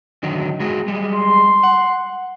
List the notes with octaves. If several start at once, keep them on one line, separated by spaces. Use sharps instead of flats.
D3 D#3 F#3
G#3 F#4 G#4
G3 G#3
C6
F#5